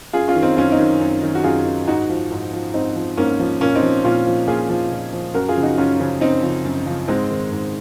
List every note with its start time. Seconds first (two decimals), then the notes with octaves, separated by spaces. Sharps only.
0.13 F#2 F4 G#4
0.28 C#4 F4
0.36 D#3
0.43 C4 D#4
0.57 F#2 C#4 F4
0.71 C4 D#4
0.79 D#3
1.01 F#2
1.22 D#3
1.35 F#4
1.44 F#2 F4 G#4
1.66 D#3
1.87 G#2 D#4 F#4
2.10 F3
2.31 G#2
2.53 F3
2.74 G#2 C4 D#4
2.96 F3
3.17 G#2 A#3 C#4
3.40 F3
3.61 A#2 A#3 C#4
3.75 C4 D#4
3.82 F3
4.04 A#2 C#4 F4
4.26 F3
4.47 A#2 F4 G#4
4.69 F3
4.92 A#2
5.13 F3
5.34 F#2 F#4 A#4
5.48 F4 G#4
5.57 C#3 F3
5.63 D#4 F#4
5.78 F#2 C#4 F4
6.00 C#3 F3
6.21 F#2 C4 D#4
6.43 C#3 F3
6.65 F#2
6.86 C#3 F3
7.08 G#2 G#3 C4
7.30 D#3
7.52 G#2